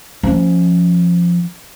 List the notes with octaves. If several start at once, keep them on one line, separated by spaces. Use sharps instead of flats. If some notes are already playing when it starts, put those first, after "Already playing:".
F3 C#4